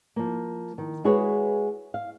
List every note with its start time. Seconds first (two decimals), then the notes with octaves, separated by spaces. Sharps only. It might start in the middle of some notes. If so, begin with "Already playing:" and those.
0.16 F3 A#3
0.78 D#3
1.04 G#3 E4 F#4 G#4 B4 C#5
1.94 F5